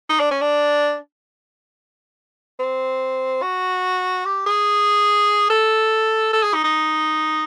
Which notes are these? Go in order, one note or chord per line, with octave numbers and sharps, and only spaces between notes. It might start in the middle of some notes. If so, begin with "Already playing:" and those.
D#4
D4
C#4
D4
C4
F#4
G4
G#4
A4
A4
G#4
D#4
D#4